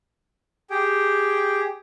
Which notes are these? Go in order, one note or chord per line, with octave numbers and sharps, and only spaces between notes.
G4 G#4 G5